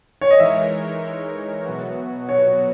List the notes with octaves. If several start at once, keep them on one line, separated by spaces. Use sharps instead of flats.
C#5
D#5
E3 G#3 D#4 A#4 C#5 E5
B2 F#3 B3 F#4
C#5